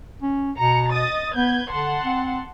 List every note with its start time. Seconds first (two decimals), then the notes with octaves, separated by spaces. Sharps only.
0.22 C#4
0.58 B2 A#5 C#7
0.91 D#5 D#6 A6
1.36 B3 B4 G6 G#6
1.71 D3 F#5 A5 C6
2.04 C4